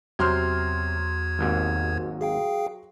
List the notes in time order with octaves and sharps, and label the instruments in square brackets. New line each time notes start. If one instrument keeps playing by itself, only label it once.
[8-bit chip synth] E2 G#6 [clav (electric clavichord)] C3 C5 [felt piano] F#3 C6 F6
[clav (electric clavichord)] G#1 D#2 G#2
[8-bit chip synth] G#4 F5 G5